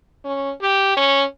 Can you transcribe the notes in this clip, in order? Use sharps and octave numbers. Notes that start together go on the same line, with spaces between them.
C#4
G4
C#4